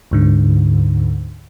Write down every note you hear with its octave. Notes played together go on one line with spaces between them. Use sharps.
D2 G#2 D3